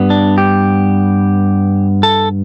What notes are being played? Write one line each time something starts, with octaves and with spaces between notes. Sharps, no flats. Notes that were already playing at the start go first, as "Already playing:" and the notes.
Already playing: G2 G3 B3
D4
G4
A4